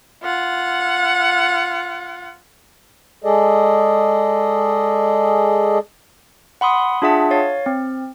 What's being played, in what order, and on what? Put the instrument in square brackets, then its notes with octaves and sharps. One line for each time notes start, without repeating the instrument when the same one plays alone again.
[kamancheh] F4 F#5
[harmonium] G#3 G#4 A4 D5 D#5
[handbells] F#5 B5 C6 D#6
D4 F4 G#4 E5 F#5 A5
C#5 F5 A6
C4